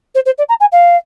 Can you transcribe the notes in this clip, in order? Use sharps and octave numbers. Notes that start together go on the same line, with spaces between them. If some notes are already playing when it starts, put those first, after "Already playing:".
C5
C5
D5
A#5
G#5
F5